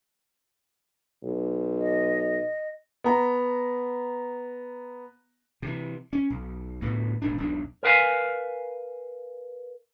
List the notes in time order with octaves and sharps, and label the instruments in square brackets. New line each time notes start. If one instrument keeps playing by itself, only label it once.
[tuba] B1
[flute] D#5
[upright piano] B3 A#5
[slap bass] C3 E3
C#4
B1
D2 A2 A3 B3
D#1 G#1 G#2 D4
E1 B1 E2 D4
[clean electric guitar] A#4 B4 F5 G5 G#5